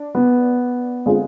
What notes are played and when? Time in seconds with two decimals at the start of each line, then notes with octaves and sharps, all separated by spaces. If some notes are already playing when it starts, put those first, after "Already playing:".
Already playing: D4
0.15 B3
1.06 D3 G#3 C4 F4 G#4